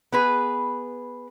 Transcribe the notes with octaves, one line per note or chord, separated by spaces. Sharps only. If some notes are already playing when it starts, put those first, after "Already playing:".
B3 G#4 B4